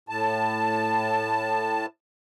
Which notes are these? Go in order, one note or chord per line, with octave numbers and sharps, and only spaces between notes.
A2 A5